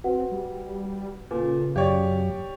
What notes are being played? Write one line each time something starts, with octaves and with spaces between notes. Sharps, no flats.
C4 F#4 B4 F#5
G3
A#2 C#3 A4 B4
F#2 F#3 G4 C#5 D5 F5